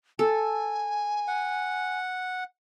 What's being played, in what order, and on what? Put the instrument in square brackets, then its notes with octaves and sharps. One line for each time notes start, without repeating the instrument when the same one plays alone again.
[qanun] A4 [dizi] G#5
[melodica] F#5